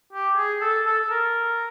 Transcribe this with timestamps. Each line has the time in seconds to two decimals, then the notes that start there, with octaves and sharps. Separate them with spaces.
0.13 G4
0.37 G#4
0.61 A4
0.86 A4
1.00 A4
1.10 A#4